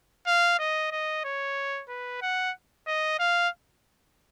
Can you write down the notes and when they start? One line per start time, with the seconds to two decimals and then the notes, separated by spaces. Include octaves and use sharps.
0.27 F5
0.59 D#5
0.92 D#5
1.24 C#5
1.89 B4
2.22 F#5
2.87 D#5
3.19 F5